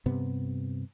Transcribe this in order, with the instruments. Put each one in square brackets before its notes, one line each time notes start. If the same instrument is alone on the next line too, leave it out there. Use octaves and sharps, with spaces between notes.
[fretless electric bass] G2 C3 B3